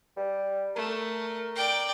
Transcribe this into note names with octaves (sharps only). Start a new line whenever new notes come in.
G3
A3 A#4
D5 G5